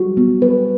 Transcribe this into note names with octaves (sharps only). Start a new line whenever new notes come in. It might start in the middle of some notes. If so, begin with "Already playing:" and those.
Already playing: G3 F#4
B3
B4